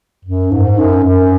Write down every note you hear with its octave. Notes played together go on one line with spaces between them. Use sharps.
F#2
G#2
F#2
F#2